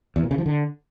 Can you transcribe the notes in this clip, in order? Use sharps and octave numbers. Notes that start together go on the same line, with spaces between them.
E2
A#2
C#3
F3
D3